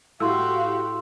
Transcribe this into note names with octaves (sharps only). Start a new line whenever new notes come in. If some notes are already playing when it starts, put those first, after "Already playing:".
A2 F#4 G4 F5 C6 E6